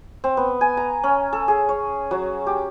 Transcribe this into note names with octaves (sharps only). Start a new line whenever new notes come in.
C4
B3
G#5
A#5
C#4
A4
G#4
C#5
F#3
G4